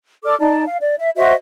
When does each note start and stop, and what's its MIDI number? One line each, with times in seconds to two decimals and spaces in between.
0.24 0.35 69
0.24 0.35 74
0.24 0.35 86
0.24 0.35 89
0.40 0.63 63
0.40 0.63 74
0.40 0.63 81
0.67 0.77 77
0.81 0.95 74
0.98 1.10 76
1.16 1.32 66
1.16 1.32 72
1.16 1.32 75
1.16 1.32 76